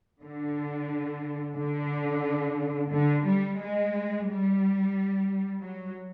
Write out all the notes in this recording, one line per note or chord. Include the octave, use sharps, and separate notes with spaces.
D3
D3
D3
G3
G#3
G3
F#3